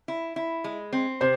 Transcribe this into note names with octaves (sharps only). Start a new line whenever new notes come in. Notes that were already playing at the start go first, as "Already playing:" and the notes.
E4
E4
G#3
C4
C3 C5